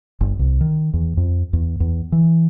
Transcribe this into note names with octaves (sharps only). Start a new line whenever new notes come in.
G1
C2
D#3
E2
F2
E2
E2
E3